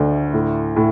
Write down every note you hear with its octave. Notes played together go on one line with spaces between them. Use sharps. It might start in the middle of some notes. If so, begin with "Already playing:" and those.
Already playing: D2 A3 D4
A2
A2